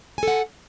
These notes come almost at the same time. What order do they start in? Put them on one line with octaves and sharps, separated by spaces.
G#5 A4 F#5